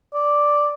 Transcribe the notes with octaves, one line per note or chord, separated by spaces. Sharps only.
D5